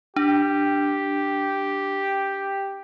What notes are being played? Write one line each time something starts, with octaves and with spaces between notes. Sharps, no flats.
D4 G4